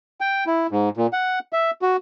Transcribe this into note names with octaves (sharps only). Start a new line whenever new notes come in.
G5
E4
G#2
A#2
F#5
E5
F#4